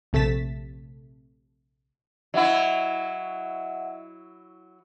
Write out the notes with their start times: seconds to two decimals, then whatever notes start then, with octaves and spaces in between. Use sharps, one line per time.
0.13 A#1 C3 A3 A6 B6 E7
2.34 F#3 E4 D#5 E5 F#5